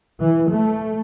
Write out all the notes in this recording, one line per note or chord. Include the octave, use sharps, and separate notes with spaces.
E3
A3